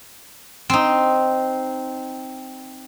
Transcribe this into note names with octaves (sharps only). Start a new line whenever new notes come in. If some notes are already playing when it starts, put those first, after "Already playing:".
C4 D#4